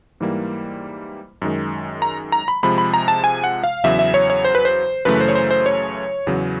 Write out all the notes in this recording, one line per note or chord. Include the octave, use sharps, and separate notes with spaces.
G#2 E3 G3 A#3
F#2 D#3 G#3
A#5
A#5
B5
C3 F3 G#3 B5
B5
A#5
A5
G#5
F#5
F5
E2 C#3 F#3 E5
E5
C#5
C#5
C5
B4
C5
F#2 C#3 E3 A3 B4
C5
C#5
C5
C5
C#5
E2 C#3 F#3